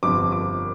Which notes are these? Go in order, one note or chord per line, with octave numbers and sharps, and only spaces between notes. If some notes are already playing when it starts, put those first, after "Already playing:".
G1 F2 C3 D6
D6